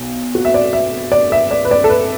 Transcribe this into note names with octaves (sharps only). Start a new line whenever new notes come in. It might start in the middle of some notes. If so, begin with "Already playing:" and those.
Already playing: B1
F#4
E5
D5
E5
D5
E5
D5
B4
D5
A4
B4